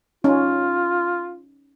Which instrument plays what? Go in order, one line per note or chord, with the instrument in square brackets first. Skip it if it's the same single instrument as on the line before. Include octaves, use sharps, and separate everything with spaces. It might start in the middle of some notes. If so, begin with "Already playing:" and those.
[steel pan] C#4 D#4 [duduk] F4